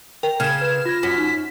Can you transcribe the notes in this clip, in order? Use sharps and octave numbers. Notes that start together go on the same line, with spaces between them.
A#4 G5
C#3 F6 G#6 E7
B4 G#6
F4 G#6 A#6
F#2 B6
D#4